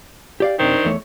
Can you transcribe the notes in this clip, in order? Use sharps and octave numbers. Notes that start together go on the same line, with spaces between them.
G4 D5 F5
F#2 C3 D#3 C4 D4
E2 A3 C#5